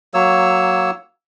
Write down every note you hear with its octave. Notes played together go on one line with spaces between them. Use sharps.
F#3 A#3 C#5 E6